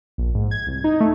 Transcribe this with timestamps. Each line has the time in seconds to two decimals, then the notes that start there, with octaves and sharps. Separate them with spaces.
0.18 A#1
0.35 G#2
0.51 G#6
0.67 C2
0.84 D#4
1.00 A3